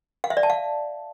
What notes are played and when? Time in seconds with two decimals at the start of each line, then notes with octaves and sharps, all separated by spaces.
0.24 F5
0.30 E5
0.37 D5
0.43 A5
0.50 F5